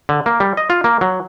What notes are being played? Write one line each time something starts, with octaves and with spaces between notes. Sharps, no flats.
D3
A#3
G3
D#5
F4
A#3
F#3